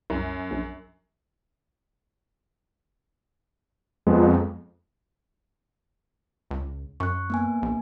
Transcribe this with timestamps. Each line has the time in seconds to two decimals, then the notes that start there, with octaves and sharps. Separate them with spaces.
0.10 C2 F#2
0.51 A#1
4.07 F2 G#3 B3
6.51 C#2
7.00 F#2 C#6 F#6
7.30 A#3 B3 G#5
7.62 A#1